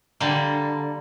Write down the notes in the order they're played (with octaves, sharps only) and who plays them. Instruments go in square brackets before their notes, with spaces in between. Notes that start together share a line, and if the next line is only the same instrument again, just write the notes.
[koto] D3 G3 A#3